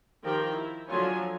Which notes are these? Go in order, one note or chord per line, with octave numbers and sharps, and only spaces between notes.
D#3 F3 G4 A#4 G5
E4
D3 F3 F#3 F4 C#5 G#5